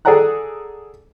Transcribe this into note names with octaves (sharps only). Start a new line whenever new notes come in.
G#4 A4 D5 F#5 A#5 F#6